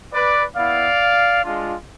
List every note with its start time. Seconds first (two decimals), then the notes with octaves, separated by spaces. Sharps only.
0.14 B4 D5
0.57 B3 E4 D5 F5
1.45 G#3 D4 F4